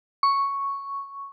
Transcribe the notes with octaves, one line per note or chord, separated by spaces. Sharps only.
C#6